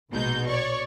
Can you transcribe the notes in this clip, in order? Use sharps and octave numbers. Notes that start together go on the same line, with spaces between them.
A#1 B2 G#3 D#4 G6
C#5 D5 C#6